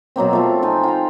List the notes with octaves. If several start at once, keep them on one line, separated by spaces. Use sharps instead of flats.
B2 F#3 A#3 C4
F3 A3 F4
D#4 G5 G#5
F4 G5 A#5